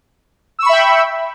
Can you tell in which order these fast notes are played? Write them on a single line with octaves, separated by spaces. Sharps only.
E6 C#6 B5 E5 G5